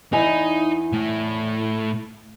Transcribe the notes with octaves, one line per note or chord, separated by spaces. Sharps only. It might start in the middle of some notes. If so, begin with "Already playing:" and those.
E2 D#4 E4 G#5
A2 A3